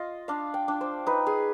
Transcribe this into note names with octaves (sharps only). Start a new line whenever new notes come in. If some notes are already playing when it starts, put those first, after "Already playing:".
Already playing: F4 D#5
D4 F5
G5
D4
C5
D#4 B4
G#4